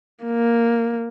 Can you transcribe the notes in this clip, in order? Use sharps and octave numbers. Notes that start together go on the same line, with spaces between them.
A#3